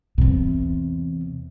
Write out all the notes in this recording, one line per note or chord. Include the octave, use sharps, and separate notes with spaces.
E2 C3